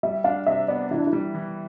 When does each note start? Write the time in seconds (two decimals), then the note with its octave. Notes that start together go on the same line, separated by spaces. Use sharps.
0.03 G3 E5
0.24 D4 F5
0.46 C3 E5
0.68 B3 D5
0.91 E3 E4
0.98 D4
1.07 E4
1.13 G3
1.34 E3